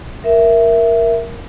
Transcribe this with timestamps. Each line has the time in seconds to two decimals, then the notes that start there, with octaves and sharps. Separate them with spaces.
0.24 A#4 E5